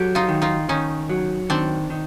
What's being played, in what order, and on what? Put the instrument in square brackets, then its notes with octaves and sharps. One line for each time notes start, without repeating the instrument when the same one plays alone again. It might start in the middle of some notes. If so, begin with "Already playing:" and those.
Already playing: [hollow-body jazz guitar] F#3 [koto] G4 A4
[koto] D#4 F4
[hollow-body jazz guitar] D#3
[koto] D#4 F4
[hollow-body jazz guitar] D#3 [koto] C#4 D#4
[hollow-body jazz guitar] F#3
[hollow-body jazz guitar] D#3 [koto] C4 D4
[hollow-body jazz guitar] D#3